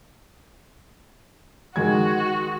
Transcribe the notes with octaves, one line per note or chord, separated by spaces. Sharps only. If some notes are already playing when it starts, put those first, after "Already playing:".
D#3 G#3 F#4 G#6